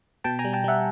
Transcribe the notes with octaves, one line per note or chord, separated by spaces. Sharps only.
B2 G5 A5
G#5 A#5
G3
G5 A5
G3 E5 F#5